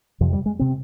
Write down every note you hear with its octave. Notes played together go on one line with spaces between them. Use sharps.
F2 C3 F3
G3
G#3
C3 C4